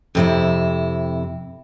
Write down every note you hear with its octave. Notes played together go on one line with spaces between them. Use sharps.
F2 C3 E4